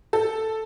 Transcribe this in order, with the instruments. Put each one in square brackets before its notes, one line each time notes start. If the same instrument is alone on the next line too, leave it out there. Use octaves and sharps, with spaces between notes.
[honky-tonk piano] A4